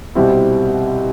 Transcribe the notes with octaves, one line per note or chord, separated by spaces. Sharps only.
C2 B2 G3 C4 E4